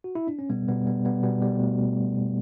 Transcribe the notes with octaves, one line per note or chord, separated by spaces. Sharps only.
F#4
E4
D4
C#4
B2 G3 B3
B2 G3 B3
B2 G3 B3
B2 G3 B3
B2 G3 B3
B2 G3 B3
B2 A3
B2
B2
B2